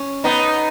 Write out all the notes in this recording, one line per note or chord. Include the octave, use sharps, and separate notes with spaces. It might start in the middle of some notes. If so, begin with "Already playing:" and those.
Already playing: C#4
B3 D#4